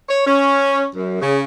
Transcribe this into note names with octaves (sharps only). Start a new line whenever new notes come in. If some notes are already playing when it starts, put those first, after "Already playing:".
C#5
C#4
F#2
C#3